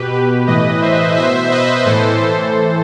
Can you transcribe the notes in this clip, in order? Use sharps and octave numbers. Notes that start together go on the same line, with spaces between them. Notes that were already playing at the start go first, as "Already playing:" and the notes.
Already playing: B2 G4 B4
G4 B4
A2 E3 B4 D#5
C5 E5
B2 C5 E5
B4 D#5
A2 E3 A4 C5
A4 C5